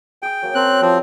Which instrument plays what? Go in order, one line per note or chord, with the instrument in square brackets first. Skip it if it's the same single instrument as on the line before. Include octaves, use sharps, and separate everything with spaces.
[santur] G#4 D#6 [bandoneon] G5
[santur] F#3 A#3 F5
[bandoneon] C4 F#6 [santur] C#4 A#4 A5
[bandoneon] F3 C4 [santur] G3 A4 C6